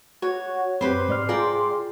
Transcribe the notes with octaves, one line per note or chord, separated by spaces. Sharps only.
F#4 C#5
F#2 C4 G4 B4 C5 B5 C6
G#2 D5 F6
F4 G#4 A#4 D5 G5